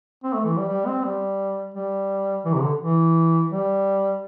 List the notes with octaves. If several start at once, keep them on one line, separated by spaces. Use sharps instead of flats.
C4
A3
E3
G3
G3
C4
G3
G3
E3
C3
D3
E3
G3